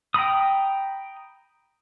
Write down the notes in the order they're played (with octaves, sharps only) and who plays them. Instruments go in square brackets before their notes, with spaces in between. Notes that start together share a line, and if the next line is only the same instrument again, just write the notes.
[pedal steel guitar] G5 A#5 B5 D#6